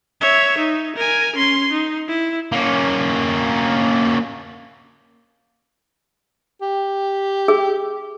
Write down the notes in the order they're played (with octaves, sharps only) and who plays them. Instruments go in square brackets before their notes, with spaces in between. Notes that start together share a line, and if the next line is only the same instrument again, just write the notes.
[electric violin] C#5 E5
D#4
A#4 G#5
C#4 C6
D#4
E4
[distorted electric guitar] A#3 C#4
[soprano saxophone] G4
[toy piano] G#4